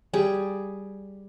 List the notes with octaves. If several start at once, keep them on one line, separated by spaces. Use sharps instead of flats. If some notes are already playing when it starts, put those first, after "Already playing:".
G3 G#4